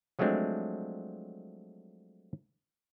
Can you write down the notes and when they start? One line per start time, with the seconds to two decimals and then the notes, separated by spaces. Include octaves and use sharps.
0.19 F3 F#3 G#3 A3 C4 D4